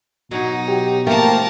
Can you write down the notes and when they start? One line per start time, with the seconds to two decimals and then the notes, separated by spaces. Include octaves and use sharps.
0.31 B2 F#3 D#4
0.68 G4
1.07 F3 A3 A#3 G4 A#4 A5